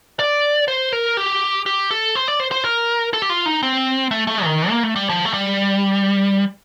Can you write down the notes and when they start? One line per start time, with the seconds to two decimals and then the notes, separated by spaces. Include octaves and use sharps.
0.19 D5
0.68 C5
0.92 A#4
1.17 G4
1.66 G4
1.91 A4
2.15 C5
2.28 D5
2.40 C5
2.51 C5
2.64 A#4
3.13 A4
3.22 G4
3.30 F4
3.46 D#4
3.63 C4
4.11 A3
4.27 A3
4.44 D#3
4.70 A#3
4.83 A3
4.96 G3
5.09 F3
5.25 A3
5.34 G3